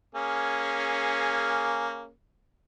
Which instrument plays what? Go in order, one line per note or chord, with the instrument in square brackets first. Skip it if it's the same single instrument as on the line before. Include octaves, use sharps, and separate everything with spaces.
[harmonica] A#3 C#4 G#4